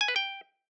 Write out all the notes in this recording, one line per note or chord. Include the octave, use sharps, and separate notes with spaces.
G#5
B4
G5